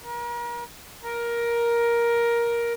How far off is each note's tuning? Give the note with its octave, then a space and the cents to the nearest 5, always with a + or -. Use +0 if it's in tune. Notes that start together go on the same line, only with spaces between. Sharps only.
A#4 +35
A#4 +10